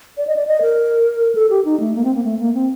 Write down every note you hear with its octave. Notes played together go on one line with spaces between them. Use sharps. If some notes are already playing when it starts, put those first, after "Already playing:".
D5
D#5
D5
D#5
A#4
A4
G4
D#4
A3
A#3
C4
A#3
A3
A#3
C4